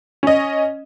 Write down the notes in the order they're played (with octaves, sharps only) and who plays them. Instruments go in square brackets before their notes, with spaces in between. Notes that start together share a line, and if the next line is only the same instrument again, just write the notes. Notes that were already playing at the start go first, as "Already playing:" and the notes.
[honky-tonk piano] C#4 D#5